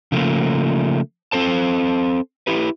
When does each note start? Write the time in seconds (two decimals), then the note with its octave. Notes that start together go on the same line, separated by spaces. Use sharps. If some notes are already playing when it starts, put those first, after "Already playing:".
0.12 C#3 F3 A3 A#3
1.32 C4 A4 C5 A5
2.47 E4 G4 B4